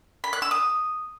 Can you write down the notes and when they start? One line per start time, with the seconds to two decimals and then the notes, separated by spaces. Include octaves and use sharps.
0.24 B5
0.33 F#6
0.42 E6
0.51 D#6